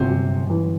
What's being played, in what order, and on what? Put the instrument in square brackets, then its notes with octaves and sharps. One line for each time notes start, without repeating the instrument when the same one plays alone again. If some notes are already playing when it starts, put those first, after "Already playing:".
Already playing: [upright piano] G1 F#2 [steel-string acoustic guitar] C3
[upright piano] G1
E3